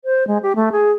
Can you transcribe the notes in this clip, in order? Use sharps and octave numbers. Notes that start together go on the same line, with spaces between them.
C5
G#3
G4
A3
G#4